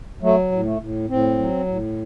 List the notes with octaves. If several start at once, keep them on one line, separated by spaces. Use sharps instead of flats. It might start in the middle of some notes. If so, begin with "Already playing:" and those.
F#3 A3
A2
A3
A2
A2 C4
F#3
A2